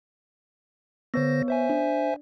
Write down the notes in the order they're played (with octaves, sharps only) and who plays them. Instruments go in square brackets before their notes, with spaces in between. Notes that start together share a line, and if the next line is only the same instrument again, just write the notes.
[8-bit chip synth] D3 C5 A#6 [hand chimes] B3 C#5
[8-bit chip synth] C5 E5 G#5
[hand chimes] D4